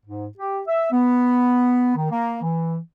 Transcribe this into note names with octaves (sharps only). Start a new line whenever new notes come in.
G#2
G4
E5
B3
D#3
A#3
E3